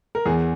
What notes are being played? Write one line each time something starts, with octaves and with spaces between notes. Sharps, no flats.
A#4
E2 G#4